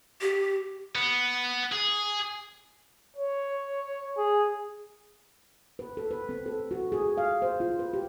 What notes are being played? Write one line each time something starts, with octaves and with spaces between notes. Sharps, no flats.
G4
B3
G#4
C#5
G#4
B4
A4
B4
C4
A4
F#4
G#4
F5
C5
F4
B4
G4